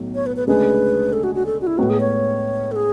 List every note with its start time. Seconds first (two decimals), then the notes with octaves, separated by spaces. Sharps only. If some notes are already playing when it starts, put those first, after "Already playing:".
Already playing: B1 A2 F#3
0.15 C#5
0.26 B4
0.36 B4
0.47 D2 C#3 G#3 D4 G#4 B4
1.13 A4
1.24 F#4
1.35 F#4
1.46 A4
1.61 F#4
1.67 E4
1.78 A2 G#3 B3 F#4
1.89 G#4
2.00 C#5
2.72 A4
2.76 G#4